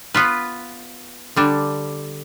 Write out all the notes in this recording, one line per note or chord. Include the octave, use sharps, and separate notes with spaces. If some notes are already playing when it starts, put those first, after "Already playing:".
B3 F4 B4
D3 G3 D4